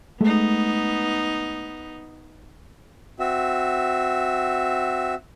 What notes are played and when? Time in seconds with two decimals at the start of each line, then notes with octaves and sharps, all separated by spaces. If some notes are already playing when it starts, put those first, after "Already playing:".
0.21 G#3 A3 B3 D#4
3.19 C4 F#4 E5